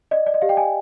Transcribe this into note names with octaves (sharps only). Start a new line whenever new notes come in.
D5 D#5
D5
D#5
G4 F5
G5
G#5